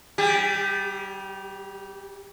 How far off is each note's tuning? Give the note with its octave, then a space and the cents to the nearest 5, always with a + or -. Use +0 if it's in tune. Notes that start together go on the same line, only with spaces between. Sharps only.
G3 -25 G4 +35